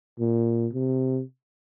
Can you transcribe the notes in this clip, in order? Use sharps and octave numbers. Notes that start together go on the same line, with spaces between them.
A#2
C3